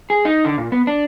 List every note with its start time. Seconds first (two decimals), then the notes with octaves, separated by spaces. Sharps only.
0.10 G#4
0.25 D#4
0.45 D3
0.58 A#2
0.72 B3
0.87 D4